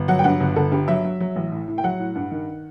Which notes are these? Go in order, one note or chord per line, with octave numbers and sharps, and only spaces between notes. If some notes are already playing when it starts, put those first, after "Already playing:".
Already playing: G1
F#3 F#5
G5
G2 F#5
G1
G1 A4
G2 G4
F#3 E5
F#3
F#3
A1
A2
A2
G5
F#3 F#5
A2
G2
D#3